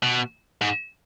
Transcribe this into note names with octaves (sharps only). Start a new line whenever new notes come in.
B2
G#2